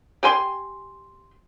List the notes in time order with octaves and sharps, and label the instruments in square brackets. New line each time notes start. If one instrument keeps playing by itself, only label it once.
[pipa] G4 G#5 C6